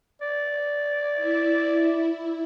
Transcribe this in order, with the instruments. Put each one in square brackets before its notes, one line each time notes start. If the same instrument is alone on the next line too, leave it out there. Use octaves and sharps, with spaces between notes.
[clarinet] D5
[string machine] E4